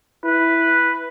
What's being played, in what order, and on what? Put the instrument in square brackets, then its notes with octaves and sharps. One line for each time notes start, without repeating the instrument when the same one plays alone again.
[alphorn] E4 [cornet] B4